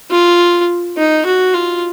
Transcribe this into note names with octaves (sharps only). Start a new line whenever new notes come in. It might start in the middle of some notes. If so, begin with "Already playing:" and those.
F4
D#4
F#4
F4